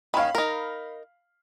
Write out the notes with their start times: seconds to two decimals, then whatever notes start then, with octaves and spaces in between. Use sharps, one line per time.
0.14 D#3 C#4 F5 B5
0.35 D#4 A#4